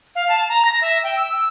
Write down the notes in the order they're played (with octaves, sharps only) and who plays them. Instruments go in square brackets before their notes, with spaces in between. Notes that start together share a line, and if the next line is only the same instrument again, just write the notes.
[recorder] F5
A5
A#5
A#6
E5
G5
E6